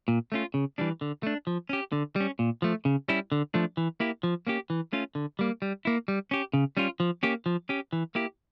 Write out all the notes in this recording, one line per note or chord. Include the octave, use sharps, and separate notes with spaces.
A#2
A3 C#4 F4
C#3
E3 G3 D4
D3
A3 D4
F3
C#4 G4
D3
G3 C#4
A#2
F3 A3
C#3
G3 C#4 E4
D3
F3 A3 D4
E3
A#3 E4 G4
F3
A#3 C#4 G4
E3
A3 C#4 F4
D3
G3 A#3
G3
A#3 E4
G3
C#4 G4
C#3
G3 C#4 F4
F3
A#3 C#4 G4
F3
C#4 G4
E3
A#3 E4 G4